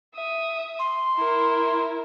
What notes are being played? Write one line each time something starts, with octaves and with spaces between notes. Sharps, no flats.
E5 D#6
C6
E4 A#4